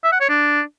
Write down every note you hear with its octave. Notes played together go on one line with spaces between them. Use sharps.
E5
F#5
C#5
D4